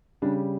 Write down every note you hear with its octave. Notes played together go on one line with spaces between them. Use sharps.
C#3 G3 D4